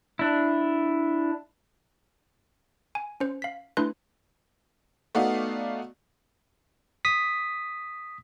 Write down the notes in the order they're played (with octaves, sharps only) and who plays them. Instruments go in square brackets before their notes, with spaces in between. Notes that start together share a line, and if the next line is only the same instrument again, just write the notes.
[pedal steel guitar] D4 E4
[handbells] G#5
C#4 C5
F5 B6
A3 D4 E4 B4 C6 F#6
[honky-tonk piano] A3 B3 D#4 F#4 D5 F5
[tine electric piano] D#6 B6